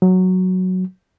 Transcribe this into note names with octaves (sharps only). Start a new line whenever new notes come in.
F#3